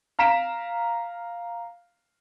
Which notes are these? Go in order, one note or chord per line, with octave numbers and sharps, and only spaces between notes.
F5 A#5 B6 D7 E7